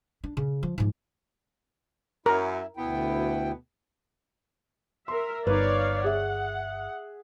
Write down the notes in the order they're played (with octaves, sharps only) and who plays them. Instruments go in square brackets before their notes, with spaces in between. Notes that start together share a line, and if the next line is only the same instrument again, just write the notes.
[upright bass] D4
C#3
F3
G#2 F3
[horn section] F#2 [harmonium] E4 [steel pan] A#4
[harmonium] D2 E4 G5 [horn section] B2 B3
[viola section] A#4 E5 [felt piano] C6
[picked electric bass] G1 [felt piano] D#4 B4 [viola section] C#5 D5 F5
[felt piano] G#4 E5 [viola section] F#5